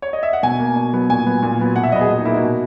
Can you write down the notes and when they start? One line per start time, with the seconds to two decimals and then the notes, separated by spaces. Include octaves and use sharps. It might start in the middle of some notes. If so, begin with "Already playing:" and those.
0.02 C#5
0.13 D#5
0.23 E5
0.33 F#5
0.43 B2 G#5
0.59 A#3
0.76 B2
0.93 F#3 B3
1.09 A#2 G#5
1.26 F#3 B3
1.43 A#2
1.59 F#3 B3
1.76 B2 F#5
1.83 E5
1.92 F#3 D#5
1.96 B3
2.01 G#4
2.09 A#2
2.17 D#4
2.25 A#3 E4
2.34 F#4
2.42 B2